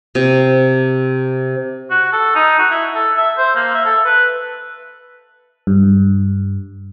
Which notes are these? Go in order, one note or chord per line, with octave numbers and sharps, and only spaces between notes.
C3
F#4
A4
D#4
F#4
E4
A4
E5
C5
A#3
E5
A4
B4
G2